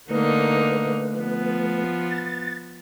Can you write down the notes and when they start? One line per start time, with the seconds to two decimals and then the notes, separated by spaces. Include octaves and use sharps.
0.10 D3 A3 A#3 D#4 B4
1.17 F3 B3
2.10 A6